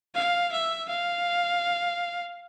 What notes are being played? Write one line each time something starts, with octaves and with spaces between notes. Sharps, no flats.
F5
E5
F5